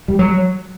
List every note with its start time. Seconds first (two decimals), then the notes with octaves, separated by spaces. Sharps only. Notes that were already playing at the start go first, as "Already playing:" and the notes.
0.08 G3
0.19 F#3